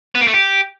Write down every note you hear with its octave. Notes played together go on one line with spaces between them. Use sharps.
B3
A#3
A3
G4